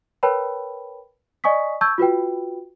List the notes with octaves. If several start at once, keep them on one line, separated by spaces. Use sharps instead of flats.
A#4 B4 C#5 G5 A5 B5
D5 D#5 G#5 C#6 D#6 B6
A5 C#6 E6 G6 G#6
F4 F#4 B4 G5